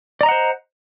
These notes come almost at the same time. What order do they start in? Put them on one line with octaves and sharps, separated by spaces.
D5 A#5 D#5 F#5 C5